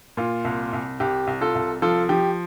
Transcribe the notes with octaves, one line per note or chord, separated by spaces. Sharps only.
A#2 F4
C2
C2
C2 G4
C2
F4 A4
C2
F3 F4 A4
F3 G4